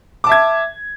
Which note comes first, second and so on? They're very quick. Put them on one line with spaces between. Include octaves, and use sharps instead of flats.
D6 A5 E5 G#6